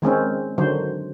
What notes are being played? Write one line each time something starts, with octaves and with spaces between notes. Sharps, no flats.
D#3 G#3 C4 C#4
D3 D#3 F#3 C5